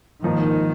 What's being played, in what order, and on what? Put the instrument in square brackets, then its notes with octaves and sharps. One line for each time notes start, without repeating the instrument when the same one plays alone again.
[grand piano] G#2 F3 A#3 D#4 [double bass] D#3